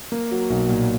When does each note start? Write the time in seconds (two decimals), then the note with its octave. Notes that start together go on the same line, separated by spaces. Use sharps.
0.12 A#3
0.31 F#3
0.50 B1
0.69 A#2